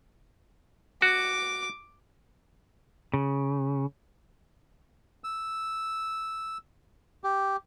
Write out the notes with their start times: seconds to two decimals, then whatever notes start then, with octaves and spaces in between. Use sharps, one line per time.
1.02 F#4 D6
3.14 C#3
5.24 E6
7.24 G4